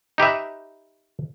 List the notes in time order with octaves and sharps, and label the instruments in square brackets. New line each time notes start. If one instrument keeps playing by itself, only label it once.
[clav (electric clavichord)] D#4 G4 B4 E5